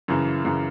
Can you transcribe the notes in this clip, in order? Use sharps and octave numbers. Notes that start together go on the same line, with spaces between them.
F#2 C#3 E3
F#2 C#3 E3